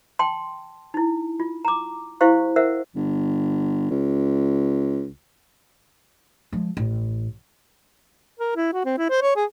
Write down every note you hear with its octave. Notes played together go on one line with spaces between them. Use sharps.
G5 A5 C6
D#4 E4
F4
A#5 D6
E4 G4 C5 F5 C#6
A#4 C5 E5 F#5
G1
C#2
F3 G#3
A1
A#4
E4
F#4
C4
E4
C5
C#5
G#4